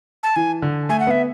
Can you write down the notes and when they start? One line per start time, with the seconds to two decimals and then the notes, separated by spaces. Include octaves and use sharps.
0.23 A5
0.36 E3 G#5
0.62 D3
0.89 A3 G#5
1.00 F#5
1.07 B3 E5